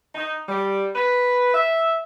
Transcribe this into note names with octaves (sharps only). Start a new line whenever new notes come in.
D#4
G3
B4
E5